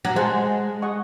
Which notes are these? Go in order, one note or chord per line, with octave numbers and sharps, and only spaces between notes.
F#3
G#3 C5 F#5 A5
G#4 D#5 F#5 C#6